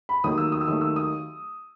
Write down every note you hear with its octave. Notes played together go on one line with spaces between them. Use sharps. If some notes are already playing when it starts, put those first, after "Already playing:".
B5
D#2 D#3 F#3 A3 D#6
E6
D#6
E6
D#2 D#3 F#3 A3 D#6
E6
D#6